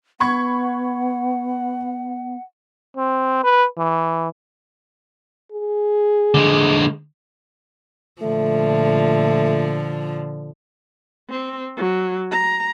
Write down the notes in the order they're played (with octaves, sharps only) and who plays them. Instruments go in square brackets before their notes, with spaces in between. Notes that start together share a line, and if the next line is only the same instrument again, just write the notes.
[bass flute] B3 [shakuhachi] F#5 [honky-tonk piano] B5 C#6 G#6
[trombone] C4
B4
E3
[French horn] G#4
[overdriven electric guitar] D3 G#3
[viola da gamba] A#2 D3 F3 [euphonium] A3
[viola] C4
F#3
A#5